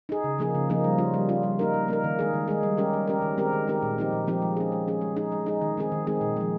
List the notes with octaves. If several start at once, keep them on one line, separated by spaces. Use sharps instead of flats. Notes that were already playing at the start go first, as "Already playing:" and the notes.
D#4 G#4
C#3
F3 A#3 D#4 G#4
C#3
F3 A#3 D#4 G#4
G3
C#4 F4
G3
C#4 F4
G3
A#3 D#4 A#4
G3
A#3 D#4 A#4
D#3
G#3 D#4 G#4
D#3
G#3 D#4 G#4
G3
C#4 G4 A#4
G3
C#4 G4 A#4
D#3
G#3 C4 G4 A#4
D#3
G#3 C4 G4 A#4
A#2
F3 C4 D#4 G4
A#2
F3 C4 D#4 G4
G#3
C#4 G#4
G#3
C#4 G#4
G#3
D#4 G#4
G#3
D#4 G#4
D#3
G#3 C4 D#4 G#4
D#3
G#3 C4 D#4 G#4
A#2
F3 G#3